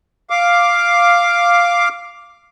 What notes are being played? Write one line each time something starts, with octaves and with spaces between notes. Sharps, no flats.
F5 D6